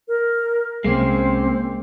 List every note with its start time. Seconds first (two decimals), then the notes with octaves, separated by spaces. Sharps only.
0.08 A#4
0.84 C2 G#3 A#3 C4 C#4 C7